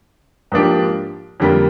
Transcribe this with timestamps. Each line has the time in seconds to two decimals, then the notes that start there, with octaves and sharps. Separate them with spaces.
0.52 G#2 F3 A#3 D4 G4
1.40 F2 D3 G3 A#3 F4